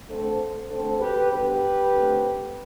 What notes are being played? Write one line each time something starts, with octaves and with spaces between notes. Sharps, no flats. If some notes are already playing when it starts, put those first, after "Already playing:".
D3 A3 C4 A4 C5
D3 A3 C4 A4 C5
G4 B4
D3 G3 B3 G4 B4
D3 A3 C4